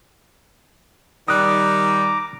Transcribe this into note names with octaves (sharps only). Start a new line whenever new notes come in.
D#3 G3 A#5 D6 D#6 F#6